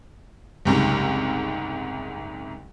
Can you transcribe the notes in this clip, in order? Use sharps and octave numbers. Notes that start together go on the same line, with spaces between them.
F#1 C2 G#2